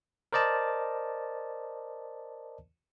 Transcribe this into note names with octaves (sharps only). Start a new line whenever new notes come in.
A#4 C5 D5 D#5 A5